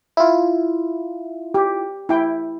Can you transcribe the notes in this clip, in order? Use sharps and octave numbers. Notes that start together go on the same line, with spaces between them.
E4 F4
G4
E4 G5